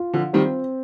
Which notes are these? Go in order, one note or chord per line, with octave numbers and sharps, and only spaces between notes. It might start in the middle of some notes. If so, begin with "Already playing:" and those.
Already playing: F4
D3 F3
D#3 G3 C4